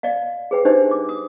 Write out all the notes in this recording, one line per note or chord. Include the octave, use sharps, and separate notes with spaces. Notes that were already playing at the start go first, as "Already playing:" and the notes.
D5 D#5 F5
G#4 B4 G5
D4 D#4 G4 B4 C5 D#5
D6
D#6